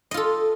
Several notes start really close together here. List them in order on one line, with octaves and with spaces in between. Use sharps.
D#5 F4 A4